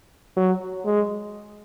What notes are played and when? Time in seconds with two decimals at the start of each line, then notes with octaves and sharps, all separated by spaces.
0.37 F#3
0.86 G#3